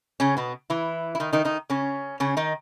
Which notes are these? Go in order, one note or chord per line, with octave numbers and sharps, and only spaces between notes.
C#3 C#4
B2 B3
E3 E4
E4
D#3 D#4
D#3 D#4
D#3 D#4
C#3 C#4
C#3 C#4
D#3 D#4